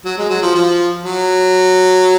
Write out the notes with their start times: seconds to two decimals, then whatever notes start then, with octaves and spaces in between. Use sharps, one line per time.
0.05 F#3
0.18 G#3
0.30 F#3
0.42 F3
0.55 F3
1.04 F#3